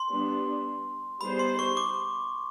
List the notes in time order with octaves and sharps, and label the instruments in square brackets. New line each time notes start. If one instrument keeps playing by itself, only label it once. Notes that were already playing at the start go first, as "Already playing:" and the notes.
Already playing: [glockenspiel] C6
[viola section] G3 B3 D4
[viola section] G3 B3 D#4 G#4 C5 [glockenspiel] B5
[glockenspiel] C6
C#6
D6